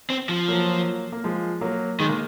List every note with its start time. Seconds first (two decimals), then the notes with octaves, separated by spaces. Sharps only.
0.10 C4
0.29 F3
0.48 F#3 A#3
1.12 A#3
1.24 F3 G#3
1.61 F#3 A#3
2.00 D#3 G#3
2.09 A#3